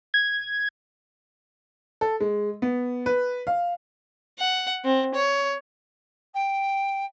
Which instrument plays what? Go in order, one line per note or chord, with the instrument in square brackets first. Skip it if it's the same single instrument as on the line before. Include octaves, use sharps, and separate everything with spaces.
[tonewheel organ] G#6
[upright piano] A4
G#3
B3
B4
F5
[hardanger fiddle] F#5
C4
C#5
[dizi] G5